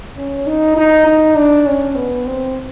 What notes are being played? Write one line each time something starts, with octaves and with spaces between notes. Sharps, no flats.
C#4
D#4
D#4
D#4
D4
C#4
B3
C4